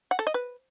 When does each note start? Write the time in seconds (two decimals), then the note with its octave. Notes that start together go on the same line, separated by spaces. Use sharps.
0.11 F#5
0.19 A4
0.27 D#5
0.34 B4